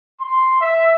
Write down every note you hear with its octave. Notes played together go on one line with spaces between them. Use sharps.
C6
E5